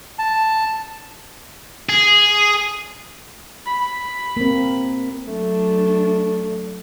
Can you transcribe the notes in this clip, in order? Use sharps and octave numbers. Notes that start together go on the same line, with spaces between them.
A5
G#4
B5
A#3 C4
F#3 A3 D4